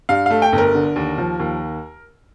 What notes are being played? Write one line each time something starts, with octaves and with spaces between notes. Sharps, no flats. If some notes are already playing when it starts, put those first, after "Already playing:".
G2 F5
A3 F5
G5
G1
A#4
D3
D#2
F3
D#2